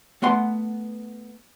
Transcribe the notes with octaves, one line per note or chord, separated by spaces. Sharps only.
A3 B3 F#5 C6